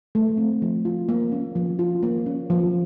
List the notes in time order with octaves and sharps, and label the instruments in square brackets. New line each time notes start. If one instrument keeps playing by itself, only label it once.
[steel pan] A3
C4
F3
F4
A#3
C#4
F3
F4
A#3
C#4
F3